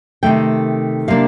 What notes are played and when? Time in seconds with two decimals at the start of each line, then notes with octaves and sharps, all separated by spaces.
0.23 C3 D#3 A3 G5
1.08 C3 G3 A#3 D4 F5